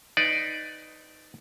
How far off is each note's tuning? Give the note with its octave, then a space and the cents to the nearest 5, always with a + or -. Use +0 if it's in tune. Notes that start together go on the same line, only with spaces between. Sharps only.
D#4 +0 B4 +20 D5 +0